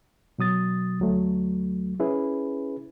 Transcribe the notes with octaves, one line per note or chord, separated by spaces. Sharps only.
B2 F#3 D#6 A6
D2 F#3 A3
C#4 E4 G#4 B4